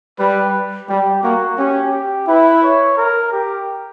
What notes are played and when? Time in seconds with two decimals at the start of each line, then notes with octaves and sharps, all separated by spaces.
0.19 G3 B4
0.89 G3 G4
1.23 A#3 F#4
1.58 C#4 G4
1.93 G4
2.28 E4 B4
2.63 C#5
2.97 A#4
3.32 G4